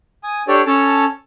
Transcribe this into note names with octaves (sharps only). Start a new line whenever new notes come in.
G#5 D#6
D4 G4 A4 C#5 D5
C#4 A4 C#5 A5